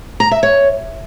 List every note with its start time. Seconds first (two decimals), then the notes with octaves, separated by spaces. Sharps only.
0.20 A#5
0.31 E5
0.43 C#5